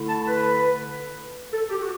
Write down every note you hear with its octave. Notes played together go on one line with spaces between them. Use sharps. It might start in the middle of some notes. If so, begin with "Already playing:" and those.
Already playing: D3 A3 E4
A5
B4
A4
G4
F#4